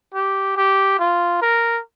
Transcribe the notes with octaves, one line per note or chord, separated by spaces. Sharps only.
G4
G4
F4
A#4